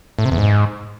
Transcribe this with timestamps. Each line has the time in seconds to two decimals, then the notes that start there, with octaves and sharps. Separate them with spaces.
0.19 A2
0.25 C3
0.32 E2
0.38 G#2